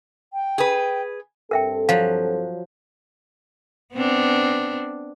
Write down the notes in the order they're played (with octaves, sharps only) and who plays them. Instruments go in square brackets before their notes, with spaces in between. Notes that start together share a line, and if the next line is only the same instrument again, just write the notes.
[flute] G5
[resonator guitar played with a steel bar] G#4 B4
[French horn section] G2 C4 A4 [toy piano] A#4 E5 G5
[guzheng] F3 F#3 [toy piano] F5
[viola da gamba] B3 C4 D4